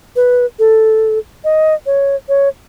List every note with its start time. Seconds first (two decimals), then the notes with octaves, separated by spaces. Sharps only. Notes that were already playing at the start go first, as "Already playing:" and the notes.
0.16 B4
0.59 A4
1.44 D#5
1.86 C#5
2.29 C#5